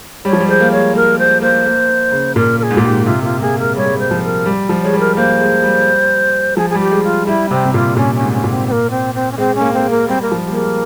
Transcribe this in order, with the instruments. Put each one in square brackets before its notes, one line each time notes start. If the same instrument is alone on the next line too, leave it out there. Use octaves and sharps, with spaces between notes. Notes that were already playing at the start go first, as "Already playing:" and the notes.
[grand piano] G3 [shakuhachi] C#5
[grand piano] F3
G3
[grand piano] G#3 [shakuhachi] C5
[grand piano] A#3
[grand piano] G#3 [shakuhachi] C#5
[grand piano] A#3 [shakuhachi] A#4
[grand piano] G#3 [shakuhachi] C5
[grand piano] A#3 [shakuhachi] C5
[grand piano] A#3
A#3
C#3
[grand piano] A#2 [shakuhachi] A#4
[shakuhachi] A#4
G#4
[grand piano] G#2
A#2
[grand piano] G#2 [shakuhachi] G4
[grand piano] C3 [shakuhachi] F4
[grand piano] A#3 [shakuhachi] F4
[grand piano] A#3 [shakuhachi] G#4
[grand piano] G#3 [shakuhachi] A#4
[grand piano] G3 [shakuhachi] C#5
[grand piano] G#3
G3
[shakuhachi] C5
[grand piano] F3
[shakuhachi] A#4
[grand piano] G3
F3
[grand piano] G#3 [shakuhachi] C#5
[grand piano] G3
[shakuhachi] A#4
[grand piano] A#3 [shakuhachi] C5
[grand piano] G#3
G3
[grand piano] F3 [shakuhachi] G#4
[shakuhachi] G#4
[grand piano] G3 [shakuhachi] G4
[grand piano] G#3
[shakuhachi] F4
[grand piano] G3 [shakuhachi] E4
[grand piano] C3 [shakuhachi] C4
[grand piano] C3
[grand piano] A#2 [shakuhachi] F4
[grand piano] A#2 [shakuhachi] C#4
[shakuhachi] C#4
[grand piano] G#2
[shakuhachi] C#4
[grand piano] A#2
[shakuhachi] C4
C4
A#3
C4
C4
C#4
[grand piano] G#3 [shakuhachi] C4
[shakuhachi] C#4
[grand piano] A#3
[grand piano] A#3 [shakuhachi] C4
[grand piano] G#3
[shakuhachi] A#3
[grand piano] G3 [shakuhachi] C4
[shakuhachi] A#3
[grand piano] F3
[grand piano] G3 [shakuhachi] A#3
[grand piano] G#3